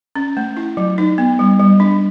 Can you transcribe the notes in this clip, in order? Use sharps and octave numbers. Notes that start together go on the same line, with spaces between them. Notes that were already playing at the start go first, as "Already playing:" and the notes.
C#4
A3
E4
F#3
D#4
B3
G3
G3
D4